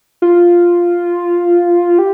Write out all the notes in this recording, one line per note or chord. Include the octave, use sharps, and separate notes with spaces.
F4
G4